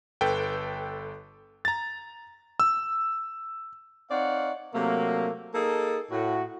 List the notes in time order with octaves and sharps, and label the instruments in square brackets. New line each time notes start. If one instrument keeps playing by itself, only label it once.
[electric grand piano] G1 A4 B4 G5
A#5 A6
E6
[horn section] C4 D#4 C#5 D5 F5 F#5
C3 F#3 A3 A#3
A#3 D#4 G#4 A4
A2 F#4